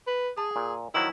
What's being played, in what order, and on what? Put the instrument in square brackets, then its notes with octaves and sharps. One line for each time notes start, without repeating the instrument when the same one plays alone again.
[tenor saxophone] B4
[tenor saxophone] G#4 [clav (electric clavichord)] A5
[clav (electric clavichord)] A#2
[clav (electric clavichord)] D#3 F3 F#3 [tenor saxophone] E4